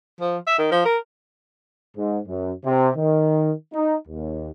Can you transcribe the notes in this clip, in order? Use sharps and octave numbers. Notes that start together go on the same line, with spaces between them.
F3
E5
D#3
F3
A#4
G#2
F#2
C3
D#3
D#4
D#2